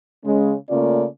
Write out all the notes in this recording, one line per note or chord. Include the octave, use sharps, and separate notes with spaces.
C#3 G#3 C#4
C#3 A3 A#3 C#4 F4 D5